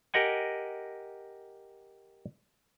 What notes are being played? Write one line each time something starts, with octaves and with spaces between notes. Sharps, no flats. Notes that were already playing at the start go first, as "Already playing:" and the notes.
G4 A#4 D#5 F#5 G#5